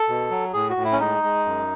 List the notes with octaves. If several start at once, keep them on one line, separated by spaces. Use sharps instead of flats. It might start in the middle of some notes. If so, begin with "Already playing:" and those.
Already playing: A4
B2
F#3
A2 G#4
F#4
A2
E4
C#4
G#3 D#4
G#3
F#2